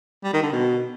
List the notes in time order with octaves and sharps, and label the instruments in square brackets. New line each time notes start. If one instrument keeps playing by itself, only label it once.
[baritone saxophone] G3
D#3
D3
B2